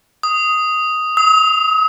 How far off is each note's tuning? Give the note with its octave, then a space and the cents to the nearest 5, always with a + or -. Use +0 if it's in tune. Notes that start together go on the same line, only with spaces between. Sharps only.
D#6 +5
D#6 +45